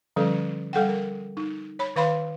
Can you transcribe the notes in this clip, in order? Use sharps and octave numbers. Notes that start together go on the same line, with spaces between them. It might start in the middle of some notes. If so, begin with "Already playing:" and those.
D3 F3 G3 C#4 A4
G3 A4 F#5 G5
A#4
D#4
C#5 B5
D#3 B4 F5 B5 C6